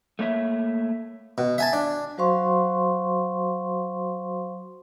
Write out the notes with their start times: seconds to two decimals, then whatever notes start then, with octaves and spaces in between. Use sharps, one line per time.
0.19 A3 A#3 C#5 E5
1.38 B2
1.58 E5 G#5 A5
1.73 D4
2.18 F#3 F#4 C5 F5 C6 C#6